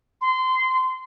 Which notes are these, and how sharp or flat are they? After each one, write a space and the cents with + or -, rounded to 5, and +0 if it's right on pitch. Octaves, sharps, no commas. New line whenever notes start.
C6 -20